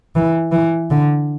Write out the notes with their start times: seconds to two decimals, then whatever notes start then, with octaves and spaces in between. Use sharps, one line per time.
0.16 E3
0.52 E3
0.90 D3